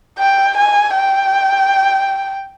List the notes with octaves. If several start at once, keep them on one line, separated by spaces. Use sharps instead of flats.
G5
G#5
G5